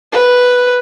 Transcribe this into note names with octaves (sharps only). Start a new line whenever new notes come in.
B4